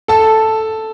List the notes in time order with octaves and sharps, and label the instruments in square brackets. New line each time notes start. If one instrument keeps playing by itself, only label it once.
[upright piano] A4 A5